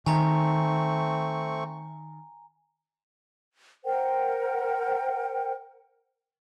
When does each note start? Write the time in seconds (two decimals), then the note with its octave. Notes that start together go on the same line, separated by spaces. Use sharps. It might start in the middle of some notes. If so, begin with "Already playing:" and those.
0.06 D#3 A3 C4 G#5 A#5 C#6
3.84 A#4 C5 F#5 G5